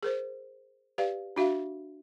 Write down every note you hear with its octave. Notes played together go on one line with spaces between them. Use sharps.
G#4 A#4 C5
G4 B4 D5 F5
D4 F#4 E5 F5